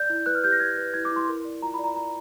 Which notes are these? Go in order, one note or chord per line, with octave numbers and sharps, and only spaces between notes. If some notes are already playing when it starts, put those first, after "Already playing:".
Already playing: D5 G6
E4
B4 F#6
F6
G4 G6
A#6
B4 G#6
B4
E4 G#6
D6
E4 C6
A#4
D5
F4 A#5
B5
D5
A#5
D5 A#5